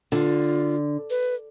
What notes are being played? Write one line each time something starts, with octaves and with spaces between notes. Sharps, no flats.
D3 F4
B4